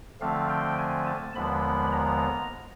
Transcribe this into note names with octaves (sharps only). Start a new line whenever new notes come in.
D3 F3 A3 C4 F5
G5
G#5
A5
D#2 D3 F3 G#3 B3 B5
A#5